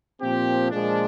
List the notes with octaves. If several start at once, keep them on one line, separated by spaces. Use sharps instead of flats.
A#2 F3 C4 G4
A#2 F3 G#3 D4